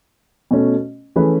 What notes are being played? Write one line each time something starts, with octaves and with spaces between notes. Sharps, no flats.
B2 A3 C#4
E3 A3 C#4 G#4 B4